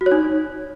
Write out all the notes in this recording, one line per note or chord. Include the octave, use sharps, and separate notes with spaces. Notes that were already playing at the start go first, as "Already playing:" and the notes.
F#4
C#5
D#4